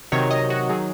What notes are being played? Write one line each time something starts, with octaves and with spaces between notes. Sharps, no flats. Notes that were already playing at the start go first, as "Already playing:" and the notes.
C3 D#3 F#3 C#5
D#5
F#4
D#3 F#3 G#4